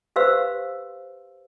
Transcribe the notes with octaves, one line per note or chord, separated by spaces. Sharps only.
G4 B4 C5 F5 C6 E6